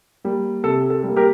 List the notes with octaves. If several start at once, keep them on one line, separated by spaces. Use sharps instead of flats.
G3 A#3
C3 A4
A4
G3
A#3
G4 A#4